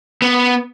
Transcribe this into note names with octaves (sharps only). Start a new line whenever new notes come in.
B3